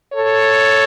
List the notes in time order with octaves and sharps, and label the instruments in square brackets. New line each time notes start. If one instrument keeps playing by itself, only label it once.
[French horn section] A4 C#5